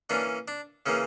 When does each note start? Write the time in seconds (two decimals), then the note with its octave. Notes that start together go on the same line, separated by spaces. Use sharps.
0.10 E3 A#3 C#4 D4
0.48 D4
0.86 C#3 E3 A#3 C#4